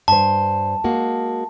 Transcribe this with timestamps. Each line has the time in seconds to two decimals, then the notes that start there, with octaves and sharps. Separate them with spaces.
0.08 G2 C5 A5
0.84 G#3 A#3 F#4